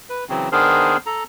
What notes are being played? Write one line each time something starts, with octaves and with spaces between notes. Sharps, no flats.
B4
C#3 E3 F#3 C4
D#3 B3 D4 G#4 A#4 C5
A4 A#5